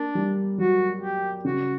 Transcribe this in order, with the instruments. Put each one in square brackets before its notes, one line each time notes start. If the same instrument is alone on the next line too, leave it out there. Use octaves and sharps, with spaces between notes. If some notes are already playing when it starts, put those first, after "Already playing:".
Already playing: [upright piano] A#3 [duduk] D4
[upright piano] G3
[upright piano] F#3 [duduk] F#4
[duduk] G4
[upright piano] C#3 [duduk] F#4